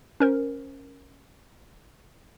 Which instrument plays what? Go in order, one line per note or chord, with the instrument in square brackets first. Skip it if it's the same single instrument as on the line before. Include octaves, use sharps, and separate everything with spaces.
[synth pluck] C#4 A#4 C5